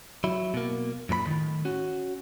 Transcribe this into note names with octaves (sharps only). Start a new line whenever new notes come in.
F#3 E4
B2 A#3
F#2 A#2 A#4 B5
A2 D#3
C#4 F#4